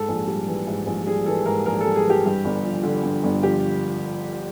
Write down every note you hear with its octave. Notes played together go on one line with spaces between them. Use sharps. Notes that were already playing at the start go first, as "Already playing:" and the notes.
Already playing: G#2 A4
A#1
G3
E3
G#2
A#1
G3 G#4
E3 A4
G#2 A#4
A#1 A#4
G3 A4
G#4
E3
G4
G2
G1
F3
D3
G2
G1
F3 G4